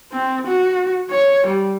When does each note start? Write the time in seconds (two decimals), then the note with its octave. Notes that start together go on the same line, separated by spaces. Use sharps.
0.12 C4
0.47 F#4
1.11 C#5
1.47 G3